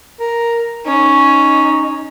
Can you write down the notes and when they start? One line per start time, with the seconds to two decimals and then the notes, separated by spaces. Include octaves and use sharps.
0.20 A#4
0.86 C#4 D#4